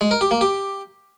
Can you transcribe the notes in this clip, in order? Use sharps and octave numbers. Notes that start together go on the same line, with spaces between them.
G#3
A#4
G4
A#3
G4